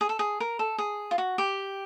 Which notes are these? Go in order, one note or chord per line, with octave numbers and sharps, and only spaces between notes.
G#4
A4
G#4
A#4
A4
G#4
F4
F#4
G4